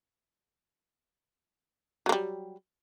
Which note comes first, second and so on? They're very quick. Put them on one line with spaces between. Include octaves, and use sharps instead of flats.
F#3 A#3 G3